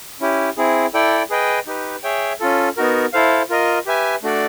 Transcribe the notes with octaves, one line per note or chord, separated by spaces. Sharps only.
C#4 E4 G4
C4 E4 G#4
E4 A4 D5 G5
G#4 B4 D#5 G5
D#4 G4 B4
G#4 C#5 E5 G5
C#4 F4 A4
B3 D#4 F#4 A#4
E4 A4 C5 F5
F4 A#4 D#5
G4 B4 E5 G#5
A3 D4 F#4 A4 D5